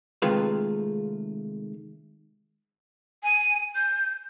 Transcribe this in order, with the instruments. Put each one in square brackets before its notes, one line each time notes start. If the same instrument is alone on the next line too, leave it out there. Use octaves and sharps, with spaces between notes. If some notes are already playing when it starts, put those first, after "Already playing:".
[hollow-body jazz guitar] C3 D#3 G#3 A3 F4 B4
[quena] G#5
G6